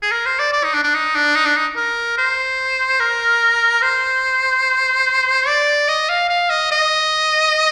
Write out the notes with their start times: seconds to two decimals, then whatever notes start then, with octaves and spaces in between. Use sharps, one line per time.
0.02 G#4
0.11 A#4
0.25 C5
0.40 D5
0.53 D5
0.64 D#4
0.74 D4
0.84 D4
0.94 D#4
1.15 D4
1.35 D#4
1.45 D4
1.56 D#4
1.77 A#4
2.18 C5
3.00 A#4
3.82 C5
5.47 D5
5.88 D#5
6.09 F5
6.29 F5
6.50 D#5
6.72 D#5